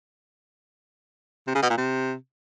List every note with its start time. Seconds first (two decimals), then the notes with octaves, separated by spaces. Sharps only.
1.47 C3
1.55 C#3
1.62 B2
1.70 A#2
1.77 C3